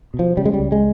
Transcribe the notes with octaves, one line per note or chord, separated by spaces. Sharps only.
B2
F3
C#3 G3
G#3
G3
C#2
G#3